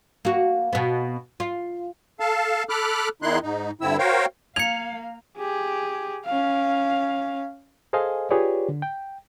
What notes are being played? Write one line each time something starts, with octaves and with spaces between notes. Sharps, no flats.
A#3 F#4
B2 B3
F4
A4 F5 A5
A4 B5 D6 F6 F#6
E2 D#3 D#4 E4 C6 F#6
G#2 D#4
G2 D3 C4 E4 E6
F#4 A#4 C5 C#5 F5 G5
A#3 F5 G#6 C#7 F7
G4 G#4
C#4 F5
G#4 A4 C5 D#5 F5 G#5
F4 G4 G#4 B4 C#5 D5
D3
G5